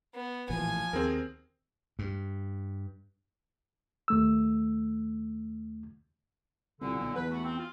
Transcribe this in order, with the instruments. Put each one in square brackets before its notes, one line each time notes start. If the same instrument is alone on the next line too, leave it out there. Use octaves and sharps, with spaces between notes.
[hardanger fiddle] B3
[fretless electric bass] A1 A#2 E3 [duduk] F3 [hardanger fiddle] G#5
[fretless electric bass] D#2 [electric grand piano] C4 G#4 A#4
[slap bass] G2
[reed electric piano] D#2 A3 E6
[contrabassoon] C2 [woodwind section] A#2 D3
[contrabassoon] B1
[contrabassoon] E2 [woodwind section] B4
[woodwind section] A3 B3 F#4
C4
F4